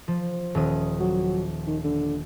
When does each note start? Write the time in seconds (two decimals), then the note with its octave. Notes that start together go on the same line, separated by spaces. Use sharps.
0.08 F3
0.55 D#1 D#6
1.00 F#3
1.67 D#3
1.84 D3